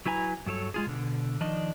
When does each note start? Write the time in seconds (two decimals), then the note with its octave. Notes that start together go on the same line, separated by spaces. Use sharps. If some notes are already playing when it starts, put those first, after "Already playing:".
0.06 F#3 E4 B4 G#5 A#5
0.46 G2 F#3 A4 C#5
0.74 G#3 F4 G#4
0.86 B2 D3
1.40 D#3 F3 D4 D#4 D5 D#5